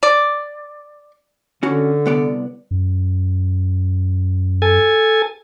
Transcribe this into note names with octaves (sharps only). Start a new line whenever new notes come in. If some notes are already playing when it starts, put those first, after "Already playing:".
D5
D3 C#4 F#4
C2 B3 D5
F#2
A4 G#5